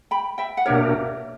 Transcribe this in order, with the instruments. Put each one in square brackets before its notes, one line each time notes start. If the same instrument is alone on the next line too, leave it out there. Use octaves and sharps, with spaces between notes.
[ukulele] G5 B5
E5 G5
F#5
[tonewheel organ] B2 A#3 D4 G4 A#4 [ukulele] C#5 E5